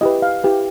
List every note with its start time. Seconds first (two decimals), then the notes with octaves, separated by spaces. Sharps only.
0.01 E4 G4 B4 D#5
0.22 F5
0.44 E4 G4 B4